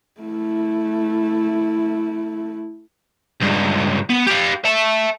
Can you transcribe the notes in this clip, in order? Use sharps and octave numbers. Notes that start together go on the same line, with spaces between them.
A3 E4
C#2 G2
B3
G4 F5
E5 A5